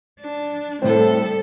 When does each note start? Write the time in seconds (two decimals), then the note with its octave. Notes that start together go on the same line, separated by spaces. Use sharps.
0.20 D4
0.82 A2 G3 C4 A4